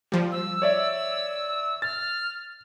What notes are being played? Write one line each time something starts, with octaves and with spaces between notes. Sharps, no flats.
F3 G3
E6
C#5 D5 E5
F6 A6